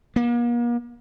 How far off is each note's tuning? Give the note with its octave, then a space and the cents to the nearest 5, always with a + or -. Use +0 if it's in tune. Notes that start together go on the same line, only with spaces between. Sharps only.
A#3 +40